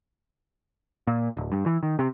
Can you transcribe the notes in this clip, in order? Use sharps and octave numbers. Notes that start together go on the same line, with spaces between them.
A#2
D1
G2
E3
D#3
C3